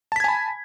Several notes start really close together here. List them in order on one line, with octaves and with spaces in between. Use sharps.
A5 B6 G#6 G#5 B5